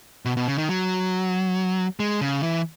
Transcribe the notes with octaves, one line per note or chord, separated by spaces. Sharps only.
B2
B2
C#3
D#3
F#3
G#3
C#3
E3